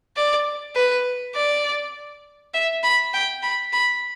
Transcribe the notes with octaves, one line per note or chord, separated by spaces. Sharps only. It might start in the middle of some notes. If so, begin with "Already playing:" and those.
D5
B4
D5
E5
B5
G5
B5
B5